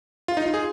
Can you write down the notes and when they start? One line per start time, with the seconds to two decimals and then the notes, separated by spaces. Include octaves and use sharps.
0.28 F4
0.37 D#4
0.46 F4
0.54 G#4